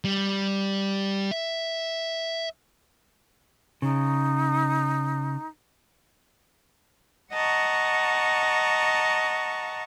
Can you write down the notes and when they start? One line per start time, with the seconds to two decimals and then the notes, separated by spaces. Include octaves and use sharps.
0.04 G3
1.31 E5
3.82 C#3 D#4
7.33 D#5 F#5 A5 A#5 C#6